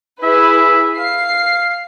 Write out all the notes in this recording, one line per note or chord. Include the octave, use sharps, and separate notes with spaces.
E4 G#4 B4 E5
F5 C7